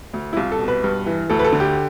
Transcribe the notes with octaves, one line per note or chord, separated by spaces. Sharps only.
D2
E4
C2 F4
A4
B2
B4
G2
E3
D2 A4
B4
A4
D3
G4